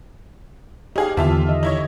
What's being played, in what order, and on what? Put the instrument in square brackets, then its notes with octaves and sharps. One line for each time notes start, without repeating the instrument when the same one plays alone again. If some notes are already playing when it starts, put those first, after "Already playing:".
[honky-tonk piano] D#4 G#4 F5 [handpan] G4
[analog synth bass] E2 [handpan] D3 D#3 [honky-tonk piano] F4 E5 A5
[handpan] D#5
[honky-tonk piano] D#4 E4 C#5